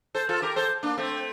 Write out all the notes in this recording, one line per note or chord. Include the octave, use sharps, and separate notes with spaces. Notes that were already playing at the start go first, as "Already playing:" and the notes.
A4 C5
F4 A4
G4 A#4
A4 C5
A#3 D4
A3 C4